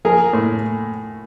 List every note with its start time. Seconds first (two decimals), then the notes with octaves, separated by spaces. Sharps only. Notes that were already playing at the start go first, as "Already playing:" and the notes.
0.05 F3 G#4 A#4
0.33 A2